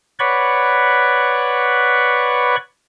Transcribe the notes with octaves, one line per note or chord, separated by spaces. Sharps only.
B4 C#5 D5 F#5 B5 C#6